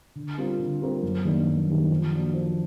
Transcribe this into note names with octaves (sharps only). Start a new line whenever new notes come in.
D3
G3 C4 F4 A#4
D3
G3 C4 F4 A#4
F#2
D#3 G3 A#3 D4
F#2
D#3 G3 A#3 D4
F3
A#3 D4 F#4
F3